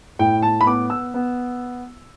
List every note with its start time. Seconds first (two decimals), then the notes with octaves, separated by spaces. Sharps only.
0.19 A2 G5
0.42 A5
0.61 B5
0.66 B3 D6
0.90 E6
1.14 B3